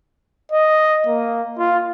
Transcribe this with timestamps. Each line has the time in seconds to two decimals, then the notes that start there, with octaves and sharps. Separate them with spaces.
0.52 D#5
1.07 A#3
1.58 F4